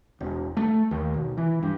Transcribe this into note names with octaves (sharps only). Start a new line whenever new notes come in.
E1
A3
D#2
B1
E3
G2